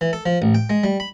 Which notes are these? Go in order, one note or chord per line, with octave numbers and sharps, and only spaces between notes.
E3
A4
F3
A1
G5
G#3
G3
B5